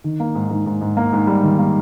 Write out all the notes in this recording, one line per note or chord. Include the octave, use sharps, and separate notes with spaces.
D#3
A#3
G#2
G#2
G#2
G#2
A#3
G#2
G3
D#3
A#3